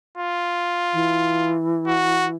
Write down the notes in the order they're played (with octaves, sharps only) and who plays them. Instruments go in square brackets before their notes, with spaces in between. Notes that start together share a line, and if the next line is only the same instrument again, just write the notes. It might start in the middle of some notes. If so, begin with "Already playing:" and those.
[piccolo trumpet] F4
[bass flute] E3
[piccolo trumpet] F#4